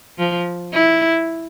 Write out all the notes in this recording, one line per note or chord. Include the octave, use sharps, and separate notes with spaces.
F3
E4